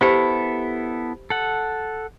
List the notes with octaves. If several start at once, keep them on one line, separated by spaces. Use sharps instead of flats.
B3 E4 G4 A4 C5 B5
A4 F#5